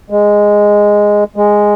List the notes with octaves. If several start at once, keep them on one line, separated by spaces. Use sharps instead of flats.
G#3
G#3